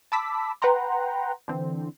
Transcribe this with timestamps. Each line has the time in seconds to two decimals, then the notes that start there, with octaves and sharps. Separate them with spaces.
0.12 A5 B5 D6 E6 B6
0.62 B4 F#5 G5 A#5 C6
1.48 D3 E3 C4